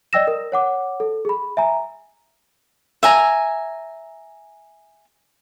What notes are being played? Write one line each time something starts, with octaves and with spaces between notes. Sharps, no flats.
D5 D#5 G5 E6 A#6 E7
A#4
C#5 F#5 D6
A4
G#4 B5
E5 G#5 A#5
E5 G#5 A#5